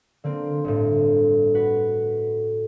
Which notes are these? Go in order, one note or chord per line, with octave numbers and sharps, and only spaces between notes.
D3 A#3 C4
G1 A2
F#4 B4